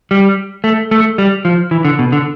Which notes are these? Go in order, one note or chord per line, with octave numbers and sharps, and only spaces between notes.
G3
A3
A3
G3
F3
E3
D3
B2
D3